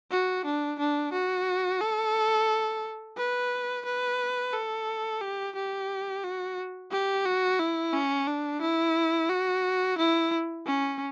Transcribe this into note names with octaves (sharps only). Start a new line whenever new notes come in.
F#4
D4
D4
F#4
A4
B4
B4
A4
G4
G4
F#4
G4
F#4
E4
C#4
D4
E4
F#4
E4
C#4